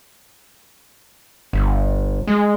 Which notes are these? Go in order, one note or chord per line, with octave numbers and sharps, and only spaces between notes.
G1
G#3